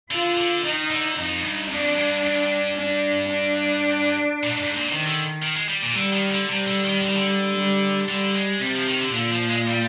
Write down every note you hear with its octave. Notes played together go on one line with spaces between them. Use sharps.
D3 F4
D3
D#3 D#4
D3
F2 D#4
G2
F2 D4
G2
G2
D4
D4
A#2
G#2
G#2
A#2
C3 D#3
D3
D#3
G#3
G3
A#2
D3 G3
D#3
D3
C3 G3
D3
D#3
D3
D#3
D3
G3
D3 G3
G#3
C3 G3
F3
D#3
D3
A#2 D3
F3
G#3
G3